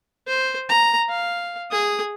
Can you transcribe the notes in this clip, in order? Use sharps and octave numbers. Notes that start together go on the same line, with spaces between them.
C5
A#5
F5
G#4 D#6